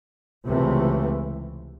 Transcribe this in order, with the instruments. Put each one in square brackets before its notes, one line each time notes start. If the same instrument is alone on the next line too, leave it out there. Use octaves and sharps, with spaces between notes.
[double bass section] C#2 C3 E3 A3